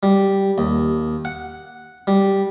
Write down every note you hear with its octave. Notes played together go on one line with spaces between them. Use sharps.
G3
D#2
F#5
G3